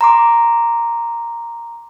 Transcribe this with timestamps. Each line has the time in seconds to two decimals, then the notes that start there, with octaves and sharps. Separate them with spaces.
0.01 A#5 C6 D6